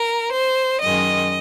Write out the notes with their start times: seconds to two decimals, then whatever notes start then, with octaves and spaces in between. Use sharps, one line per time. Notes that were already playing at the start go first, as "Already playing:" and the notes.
Already playing: A#4
0.33 C5
0.82 F#2 D#3 G#3 D#5